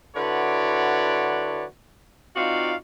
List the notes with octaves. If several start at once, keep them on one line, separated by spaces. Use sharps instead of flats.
D3 E4 F#4 B4 C#5 D5
C4 D#4 F4 F#4 D5 F5